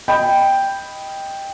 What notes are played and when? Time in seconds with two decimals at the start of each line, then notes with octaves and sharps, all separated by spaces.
0.08 D#5 G5 B5